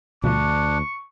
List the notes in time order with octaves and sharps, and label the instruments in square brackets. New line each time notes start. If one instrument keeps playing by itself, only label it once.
[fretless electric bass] D2 [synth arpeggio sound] B2 F3 A3 [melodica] D4 [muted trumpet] C#6